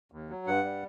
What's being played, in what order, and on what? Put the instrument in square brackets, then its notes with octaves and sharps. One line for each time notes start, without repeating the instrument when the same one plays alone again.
[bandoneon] D#2
F#3
G2 F#5
G3